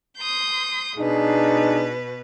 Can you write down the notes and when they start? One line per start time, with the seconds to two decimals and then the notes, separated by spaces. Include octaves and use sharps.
0.18 C6 D#6 G6
0.97 B2 D4 D#4 G#4 B4